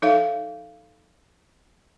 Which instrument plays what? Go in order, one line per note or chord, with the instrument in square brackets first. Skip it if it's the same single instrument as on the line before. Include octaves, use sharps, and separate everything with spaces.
[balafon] F3 D#4 A4 C#5 E5 F5